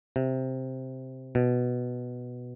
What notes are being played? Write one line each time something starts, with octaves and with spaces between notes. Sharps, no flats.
C3
B2